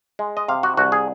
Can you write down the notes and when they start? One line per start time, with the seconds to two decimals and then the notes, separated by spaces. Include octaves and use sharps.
0.19 G#3
0.37 D#5
0.48 C3 F5
0.63 F#4
0.77 C2 F#4
0.92 G#4